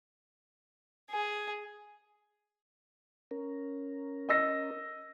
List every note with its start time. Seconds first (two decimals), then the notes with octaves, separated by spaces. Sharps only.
1.10 G#4
3.31 C#4 A#4
4.29 D#5 E6 A#6